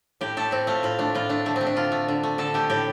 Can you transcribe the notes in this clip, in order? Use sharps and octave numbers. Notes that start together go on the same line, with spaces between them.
A2 G4
A3 A4
A2 C4
A3 F4
A2 F4
A3 D4
A2 F4
A3 D4
D3 A3
C4
A3
D4
D3 F4
A3
D3
A3
D3 A4
A3 G4
A2 G4